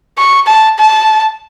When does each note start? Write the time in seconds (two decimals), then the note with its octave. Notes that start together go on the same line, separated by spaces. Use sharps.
0.18 C#6
0.47 A5
0.79 A5